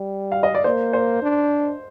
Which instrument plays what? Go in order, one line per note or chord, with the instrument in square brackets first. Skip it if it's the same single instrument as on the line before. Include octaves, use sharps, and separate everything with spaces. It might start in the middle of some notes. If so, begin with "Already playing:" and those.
Already playing: [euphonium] G3
[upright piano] F5
D#5
D5
[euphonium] A#3 [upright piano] C5
[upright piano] C5
[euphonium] D4